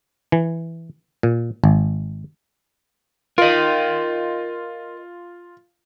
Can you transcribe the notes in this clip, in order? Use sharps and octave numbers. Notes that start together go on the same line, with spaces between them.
E3
A#2
G#1
F4 A#4 D#5